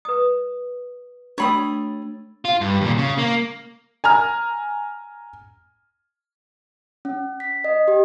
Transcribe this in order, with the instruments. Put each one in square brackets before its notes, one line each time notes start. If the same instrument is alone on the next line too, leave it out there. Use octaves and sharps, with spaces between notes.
[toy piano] B4 D#6
[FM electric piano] A3 D4 [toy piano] F#4 G5 [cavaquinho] C#5 B5 D#6
[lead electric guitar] F4
G2
D#2 A#2
C#3
A#3
[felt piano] G#5 A#5 F6
[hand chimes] C#4
B6
D#5
G4